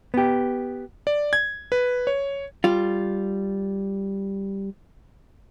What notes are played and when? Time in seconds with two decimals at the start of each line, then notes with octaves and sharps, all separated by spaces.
0.14 B3 G4
1.07 D5
1.33 G#6
1.72 B4
2.07 C#5
2.64 G3 F4